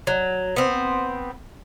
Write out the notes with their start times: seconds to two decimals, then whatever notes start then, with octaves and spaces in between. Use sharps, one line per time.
0.07 F#3
0.56 B3 C4